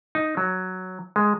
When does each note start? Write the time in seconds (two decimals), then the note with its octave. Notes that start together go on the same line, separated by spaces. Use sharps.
0.15 D#4
0.37 F#3
1.16 G#3